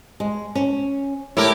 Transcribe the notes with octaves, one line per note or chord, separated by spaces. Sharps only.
G#3
C#4
A3 E4 G4 A#4 C#5